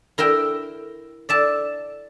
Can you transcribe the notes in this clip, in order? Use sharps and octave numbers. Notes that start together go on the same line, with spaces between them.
E4 A#4 E5 G5
D5 E5 A5